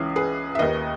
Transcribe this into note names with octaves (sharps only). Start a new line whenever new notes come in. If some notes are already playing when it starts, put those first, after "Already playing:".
Already playing: C#2 C#3 E3 G#4
G#4 B4
E5
D#2 D#3 B4 D#5